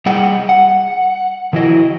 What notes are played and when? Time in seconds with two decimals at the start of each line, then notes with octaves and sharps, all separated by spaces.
0.06 G3 G#4 D#5 F#5 G5
0.49 F#5
1.53 D#3 F3 E4 F#4 D#5